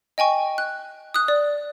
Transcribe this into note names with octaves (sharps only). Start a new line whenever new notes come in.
D#5 G5 G#5 C#6
F#6
D#6 F#6
D5